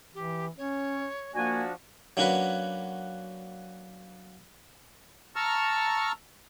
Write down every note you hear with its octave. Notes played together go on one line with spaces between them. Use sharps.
E3 G4
C#4 C#5
F3 A#3 D4 F#4 G#5
F#3 A#3 C#4 D4 F#4 B4
A5 A#5 C#6 E6 F6